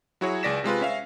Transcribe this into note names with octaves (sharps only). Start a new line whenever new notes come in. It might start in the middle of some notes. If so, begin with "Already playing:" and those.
F#3 E4 F#4 G#4 C#5
C#2 G#4 D5 A#6 B6 E7
C3 G#3 F4 B4
C#4 E5 F5